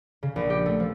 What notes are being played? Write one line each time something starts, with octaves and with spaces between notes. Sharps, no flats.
C#3
A#1
G4
A3
F3